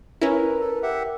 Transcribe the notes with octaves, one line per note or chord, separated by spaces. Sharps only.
C#4 E4 A#4 B4
A4
G4 E5 F#5